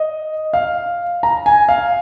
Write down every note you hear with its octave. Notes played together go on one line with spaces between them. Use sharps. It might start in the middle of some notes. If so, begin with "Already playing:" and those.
Already playing: D#5
F5
A#5
G#5
F5